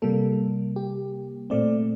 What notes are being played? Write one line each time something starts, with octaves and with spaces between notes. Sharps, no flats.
C3 G3 A#3 A4
G4
A#2 A3 C4 D5